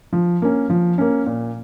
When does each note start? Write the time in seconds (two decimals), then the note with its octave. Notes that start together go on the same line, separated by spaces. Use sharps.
0.13 F3
0.42 A#3 C#4
0.70 F3
0.98 A#3 C#4
1.26 A#2